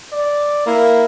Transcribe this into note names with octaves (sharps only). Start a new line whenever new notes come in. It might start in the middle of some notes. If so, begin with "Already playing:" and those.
D5
A#3 E4